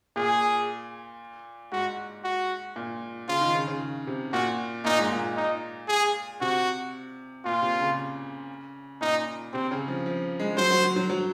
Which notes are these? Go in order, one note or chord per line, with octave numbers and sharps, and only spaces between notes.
A#2 G#4
G#2 F#4
F#4
A#2
C#3 F4
D#3
C#3
C#3
C3
A#2 F#4
A#2 D#4
G#2
A#2
D#4
G#4
C3 F#4
A#2 F4
C3
C#3
A#2 D#4
C3 C4
C#3
F3
F3
G#3
F#3 C5
F#3
F#3
F#3
F#3